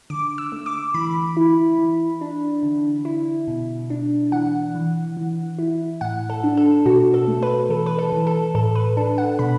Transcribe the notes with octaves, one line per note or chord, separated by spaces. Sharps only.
D3 D6
E6
A3
D6
E3 B5
E4
E3
D4
D3
E4
B2
D4
E3 F#5
E3
E3
E4
A2 F#5
A4
D4
A4
B2 F#4
A4
A3
B4
E3 A4
B4
A4
E3
A4
A2 A4
B4
D4 A4
F#5
B2 B5